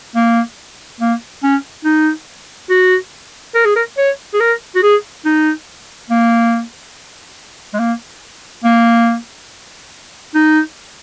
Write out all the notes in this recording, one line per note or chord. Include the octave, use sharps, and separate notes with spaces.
A#3
A#3
C#4
D#4
F#4
A#4
G#4
A#4
C#5
G#4
A#4
F#4
G#4
D#4
A#3
G#3
A#3
A#3
D#4